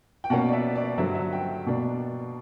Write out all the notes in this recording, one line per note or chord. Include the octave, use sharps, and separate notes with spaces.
G5
B2 A#3 C#4 F#5
D5
E5
D5
G2 D3 F#3 E5
E5
G5
B2 A#3 D4